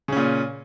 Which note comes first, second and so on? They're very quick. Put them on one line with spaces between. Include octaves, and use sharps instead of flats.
C#3 C#4 A#2